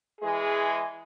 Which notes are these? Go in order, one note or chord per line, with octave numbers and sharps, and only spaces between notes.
E3 G#3 G#4